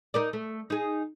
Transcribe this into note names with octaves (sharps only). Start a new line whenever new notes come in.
D#4 A#4 D5
A3
D#4 G#4